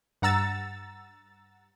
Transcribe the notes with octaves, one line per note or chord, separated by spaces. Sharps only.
G2 F#5 A#5 E6 A6